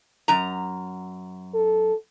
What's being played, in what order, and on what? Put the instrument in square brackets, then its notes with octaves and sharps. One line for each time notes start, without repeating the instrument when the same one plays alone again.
[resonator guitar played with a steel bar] F#2 A#5
[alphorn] A4